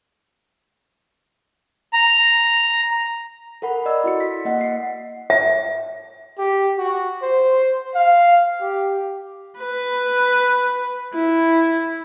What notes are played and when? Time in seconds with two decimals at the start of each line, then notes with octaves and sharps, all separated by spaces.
1.93 A#5
3.62 A4 A#4 F#5 B5
3.86 D5 D#5 E6
4.04 E4 F#4 C#7
4.20 B6
4.45 A#3 D#5 F#5
4.61 C7 C#7
5.30 E5
6.38 G4
6.78 F#4
7.22 C5
7.95 F5
8.61 G4
9.59 B4
11.14 E4